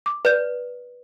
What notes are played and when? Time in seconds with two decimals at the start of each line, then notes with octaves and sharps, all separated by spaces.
0.06 D6
0.25 B4 D5 G6